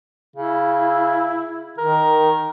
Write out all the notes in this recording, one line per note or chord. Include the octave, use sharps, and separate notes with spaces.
C#3 E4
D#3 A#4